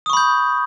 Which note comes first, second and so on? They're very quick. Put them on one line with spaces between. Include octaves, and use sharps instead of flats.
D#6 C#6 B5 G6